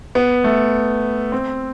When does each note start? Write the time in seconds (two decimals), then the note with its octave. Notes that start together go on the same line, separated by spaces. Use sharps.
0.15 B3
0.44 A3
1.32 C4